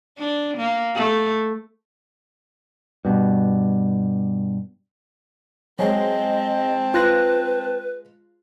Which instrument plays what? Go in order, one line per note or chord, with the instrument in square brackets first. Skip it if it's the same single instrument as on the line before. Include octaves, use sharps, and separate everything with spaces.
[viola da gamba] D4
A#3
A3
[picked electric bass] G2 B2
[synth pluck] F#3 [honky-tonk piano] G#3 G#4 C5 [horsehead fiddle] C4 A5 [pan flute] D#5
[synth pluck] F4 F#6 A#6 [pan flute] B4